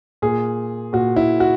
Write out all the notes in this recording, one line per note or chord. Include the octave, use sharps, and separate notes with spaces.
A#2 G#4
A#2 F#4
E4
F#4